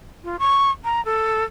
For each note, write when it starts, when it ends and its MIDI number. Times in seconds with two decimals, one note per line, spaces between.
0.24 0.36 65
0.39 0.71 85
0.84 1.03 82
1.05 1.44 69